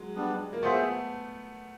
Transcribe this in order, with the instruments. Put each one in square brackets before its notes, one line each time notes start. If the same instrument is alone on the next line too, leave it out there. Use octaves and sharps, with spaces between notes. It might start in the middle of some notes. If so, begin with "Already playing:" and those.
Already playing: [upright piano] F#3 G#3
[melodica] G3 B3 D4
[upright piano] A#3
[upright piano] A3 B3 [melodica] F4 G#4 C5 E5